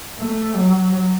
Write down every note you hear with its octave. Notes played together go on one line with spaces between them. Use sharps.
A3
F#3